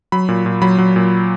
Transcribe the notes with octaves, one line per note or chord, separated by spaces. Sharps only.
F#3 B5
A#2
A#2
F#3 B5
F#3
A#2